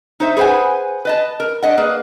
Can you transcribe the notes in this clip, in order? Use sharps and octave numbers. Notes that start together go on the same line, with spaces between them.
D#4 C5 E5
G#4 B4 C5 F#5 G#5
B4 D#5 A5
A#4
D4 D#5 F#5
A#3 G#4 B4